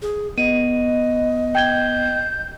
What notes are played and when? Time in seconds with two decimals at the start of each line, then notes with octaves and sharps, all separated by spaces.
0.02 G#4
0.38 B3 D#5 D#7
1.55 G5 G6 G#6 G7